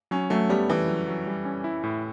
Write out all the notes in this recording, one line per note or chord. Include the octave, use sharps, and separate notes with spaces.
F#3 C#4
F#3 A3
G3 B3
E3 E4
F#3
F#3
G3
C#4
E4
A2